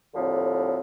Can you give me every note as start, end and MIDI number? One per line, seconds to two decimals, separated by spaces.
0.15 0.81 39
0.15 0.81 45
0.15 0.81 50
0.15 0.81 53
0.15 0.81 60